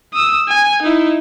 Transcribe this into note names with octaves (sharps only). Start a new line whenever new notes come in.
D#6 E6
G#5
D#4 E4